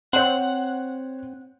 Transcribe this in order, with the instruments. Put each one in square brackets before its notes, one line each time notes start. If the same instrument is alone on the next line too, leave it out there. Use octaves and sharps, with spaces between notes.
[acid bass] C4 [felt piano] C5 C#5 [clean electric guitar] F#5